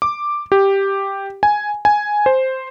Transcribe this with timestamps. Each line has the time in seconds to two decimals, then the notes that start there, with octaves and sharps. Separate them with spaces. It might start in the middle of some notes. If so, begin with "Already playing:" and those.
0.02 D6
0.52 G4
1.43 G#5
1.85 G#5
2.26 C5